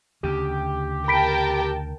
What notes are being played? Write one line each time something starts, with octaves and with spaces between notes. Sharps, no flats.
D2 C#3 G4
A#4 G5 A5 B5 B6 D7